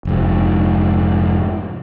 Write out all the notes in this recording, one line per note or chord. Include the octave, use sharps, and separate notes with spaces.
F1 G#2